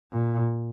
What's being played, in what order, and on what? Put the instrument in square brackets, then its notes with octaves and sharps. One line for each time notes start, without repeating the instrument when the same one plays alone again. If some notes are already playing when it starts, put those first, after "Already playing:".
[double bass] A#2